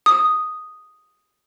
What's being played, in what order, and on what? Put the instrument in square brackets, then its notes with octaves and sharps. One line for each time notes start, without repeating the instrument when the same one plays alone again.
[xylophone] D#6